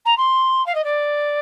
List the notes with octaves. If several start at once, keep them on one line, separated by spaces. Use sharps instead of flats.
A#5
C6
F5
D#5
D5